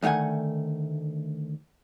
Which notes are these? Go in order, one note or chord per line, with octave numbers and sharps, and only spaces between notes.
D2 D#3 A3 F#5 G#5